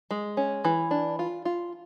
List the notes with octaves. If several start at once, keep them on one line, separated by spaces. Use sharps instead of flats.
G#3
C#4
E3
D4
F4
F4